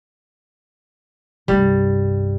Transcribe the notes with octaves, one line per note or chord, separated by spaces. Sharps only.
C2 G2 G3